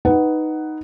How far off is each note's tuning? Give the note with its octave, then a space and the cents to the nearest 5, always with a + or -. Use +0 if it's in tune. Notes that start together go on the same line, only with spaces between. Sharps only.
D#4 +0 B4 +0 F#5 +10